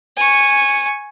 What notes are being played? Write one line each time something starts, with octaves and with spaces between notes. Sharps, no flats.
G#5 C#6